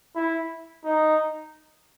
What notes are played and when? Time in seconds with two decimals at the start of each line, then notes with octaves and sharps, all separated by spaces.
0.15 E4
0.84 D#4